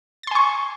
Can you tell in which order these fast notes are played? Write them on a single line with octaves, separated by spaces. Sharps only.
A6 C6 G#5 C#6